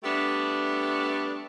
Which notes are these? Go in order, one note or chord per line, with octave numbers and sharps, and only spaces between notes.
G3 A3 B3 D4